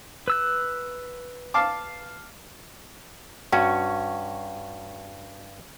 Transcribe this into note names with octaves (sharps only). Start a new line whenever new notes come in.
B4 E6 F#6
F5 A5 D6
G2 C#4 F#4